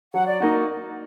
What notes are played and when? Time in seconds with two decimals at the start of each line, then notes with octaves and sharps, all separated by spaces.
0.13 F#3 F#5
0.26 D5
0.40 A#3 D#4 F#4 D#5